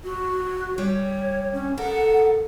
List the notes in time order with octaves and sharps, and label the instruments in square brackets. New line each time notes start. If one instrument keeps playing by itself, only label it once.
[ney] F#4
[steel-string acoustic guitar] G3 [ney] C#5
[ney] C#4
[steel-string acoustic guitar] A4 A#4 [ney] F#5